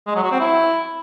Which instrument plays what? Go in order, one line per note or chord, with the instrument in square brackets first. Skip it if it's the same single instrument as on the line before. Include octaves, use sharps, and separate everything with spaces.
[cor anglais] G#3
F#3
F#4
C4
E4